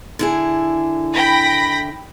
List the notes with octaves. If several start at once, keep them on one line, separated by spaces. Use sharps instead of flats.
D3 E4 G#4
G5 B5 A#6